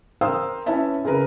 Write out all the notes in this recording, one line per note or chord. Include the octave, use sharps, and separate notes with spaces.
A#4 C5 F5 G5 D#6 E6
C#4 E4 B4 C#5 E5 A5
C#3 G#4 A#4 B4